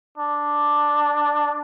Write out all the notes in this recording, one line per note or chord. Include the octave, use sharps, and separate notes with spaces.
D4